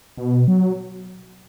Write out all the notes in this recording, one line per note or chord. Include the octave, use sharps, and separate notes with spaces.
B2
F#3